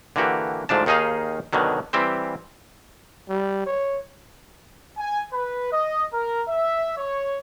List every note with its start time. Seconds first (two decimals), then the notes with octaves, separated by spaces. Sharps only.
0.16 D3 E3 A#3 F#4 G4
0.69 D2 G#2 F3 D4 A5
0.86 D#2 D#3 D#4 G#4 D#5 F5
1.53 B2 D3 D#3 F#3
1.93 E3 G3 C4 G4 C5
3.29 G3
3.67 C#5
4.98 G#5
5.33 B4
5.72 D#5
6.13 A#4
6.48 E5
6.97 C#5